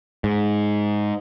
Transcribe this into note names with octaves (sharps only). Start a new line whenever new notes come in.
G#2